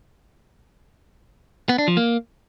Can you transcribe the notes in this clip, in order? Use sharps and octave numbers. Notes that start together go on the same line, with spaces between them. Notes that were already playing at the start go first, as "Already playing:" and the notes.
B3
D4
F3
A#3